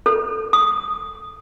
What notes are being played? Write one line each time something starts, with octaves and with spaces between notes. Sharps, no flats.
A4
D#6